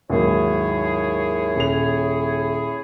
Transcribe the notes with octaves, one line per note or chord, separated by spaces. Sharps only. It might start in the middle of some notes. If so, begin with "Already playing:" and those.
D#2 G#2 F#3 E4 G#4 C#5
D#1 F7